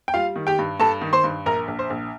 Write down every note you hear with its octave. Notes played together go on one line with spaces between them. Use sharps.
G5
G3 F4 F5
D#3
G4 G5
G2
G2 A4 A5
D#3
C5 C6
G2
A#1 A#4 A#5
A#1
C5
A#1